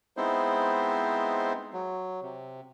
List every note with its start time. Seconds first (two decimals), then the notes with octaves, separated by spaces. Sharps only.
0.17 G#3 B3 C4 D#4 E4 C5
1.73 F#3
2.22 C3